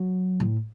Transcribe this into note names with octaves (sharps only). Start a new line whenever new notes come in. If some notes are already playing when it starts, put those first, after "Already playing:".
Already playing: F#3
A2